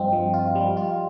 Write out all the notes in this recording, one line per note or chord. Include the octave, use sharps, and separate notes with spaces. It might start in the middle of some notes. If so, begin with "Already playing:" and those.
Already playing: G2 F3 C4 F4 D#5 G5
F3
F4
G3
F4